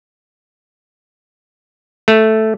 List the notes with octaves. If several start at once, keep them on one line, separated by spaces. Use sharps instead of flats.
A3